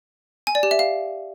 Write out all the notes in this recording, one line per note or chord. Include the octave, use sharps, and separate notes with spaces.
G#5
D5
G4
E5
F5